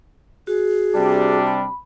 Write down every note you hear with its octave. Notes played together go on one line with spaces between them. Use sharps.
F#4 G#4
C3 G3 D4
B5